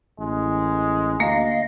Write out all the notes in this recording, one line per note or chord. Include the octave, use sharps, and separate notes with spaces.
A1 G#3
D2 A#3 D#5 F5